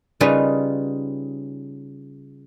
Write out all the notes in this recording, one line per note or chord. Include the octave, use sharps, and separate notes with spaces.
C#3 G3 C#4 D#4 F4 B4